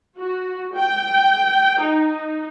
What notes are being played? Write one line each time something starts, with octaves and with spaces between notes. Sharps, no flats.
F#4
G5
D#4